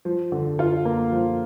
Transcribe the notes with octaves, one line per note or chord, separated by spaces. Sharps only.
F3
D3
F4
A#3
F3